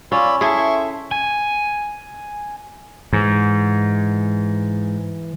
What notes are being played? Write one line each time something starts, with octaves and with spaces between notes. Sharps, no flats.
C#4 F4 D5 B5 E6
E4 G#4 A4 E5 C6 C#6
G#5
G#2 E3